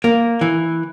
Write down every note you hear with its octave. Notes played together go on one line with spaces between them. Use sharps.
A#3
E3